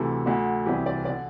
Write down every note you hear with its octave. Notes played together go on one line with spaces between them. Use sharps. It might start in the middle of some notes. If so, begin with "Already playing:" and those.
Already playing: D2 C3 E3 A4
D2 D3
C2 C3 E3 G4
D5
D3 D5